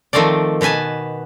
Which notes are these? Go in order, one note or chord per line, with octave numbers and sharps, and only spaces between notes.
D#3 F3 A3 C4 D5
B2 B3 B4 G#5 A5